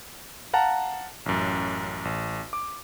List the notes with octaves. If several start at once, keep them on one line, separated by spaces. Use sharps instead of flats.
F5 F#5 A5 A#5
A1 F#2
A1
D6